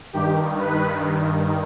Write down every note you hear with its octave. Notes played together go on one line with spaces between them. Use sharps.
G2 D#3 G4
B4